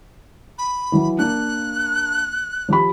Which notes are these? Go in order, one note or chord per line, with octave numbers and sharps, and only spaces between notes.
B5
E3 F#3
A#3 D4 F#6
F3 G4 B5